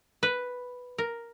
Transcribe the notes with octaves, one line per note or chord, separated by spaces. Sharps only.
B4
A#4